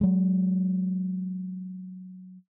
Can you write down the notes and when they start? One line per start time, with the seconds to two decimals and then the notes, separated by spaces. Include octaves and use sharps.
0.01 F#3 G#3